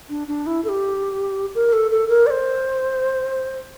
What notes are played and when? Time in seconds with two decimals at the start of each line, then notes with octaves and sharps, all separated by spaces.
0.10 D4
0.28 D4
0.46 E4
0.64 A4
0.69 G4
1.55 A#4
1.73 A4
1.91 A4
2.09 A#4
2.26 D5
2.30 C5